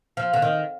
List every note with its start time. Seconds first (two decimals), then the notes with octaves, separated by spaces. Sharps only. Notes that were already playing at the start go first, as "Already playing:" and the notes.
0.17 F3
0.33 D3
0.42 D#3